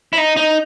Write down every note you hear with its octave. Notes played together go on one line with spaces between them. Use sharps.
E4
D#4
D#4